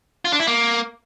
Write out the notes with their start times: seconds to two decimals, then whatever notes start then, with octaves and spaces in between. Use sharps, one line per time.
0.25 F4
0.32 D4
0.40 E4
0.47 A#3